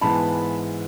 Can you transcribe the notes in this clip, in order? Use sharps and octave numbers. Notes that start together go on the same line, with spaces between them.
G#2 E3 G#3 B3 A5 B5